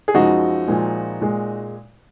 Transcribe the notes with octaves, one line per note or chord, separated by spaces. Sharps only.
G#4
F#2 F3 G#3 D#4 F#4
A#2 F3 G#3
A#2 G#3